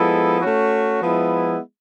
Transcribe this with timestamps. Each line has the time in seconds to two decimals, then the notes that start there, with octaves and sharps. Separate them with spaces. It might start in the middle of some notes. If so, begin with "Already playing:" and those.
Already playing: F3 G#3 B3 E4 A4
0.41 A3 C#4 F#4
1.00 F3 G#3 B3 E4